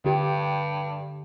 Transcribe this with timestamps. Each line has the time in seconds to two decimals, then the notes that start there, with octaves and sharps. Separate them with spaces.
0.05 G2 D3 G4